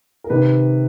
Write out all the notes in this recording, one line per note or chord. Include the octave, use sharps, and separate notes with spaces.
A#4
C3 D#3 B4